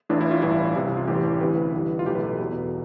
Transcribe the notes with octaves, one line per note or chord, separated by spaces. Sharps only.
A1 A2 E3 D4
E4
F4
A1 G2 E3 E4
C2 C3 E3
F4
A1 A2 E3 G4
D2 C3 E3 B4
G1 G2 E3
F4
B1 A2 E3 G4
B4
A4
E2 B2